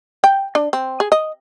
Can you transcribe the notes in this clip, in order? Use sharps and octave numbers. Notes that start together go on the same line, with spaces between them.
G5
D4
C4
G#4
D#5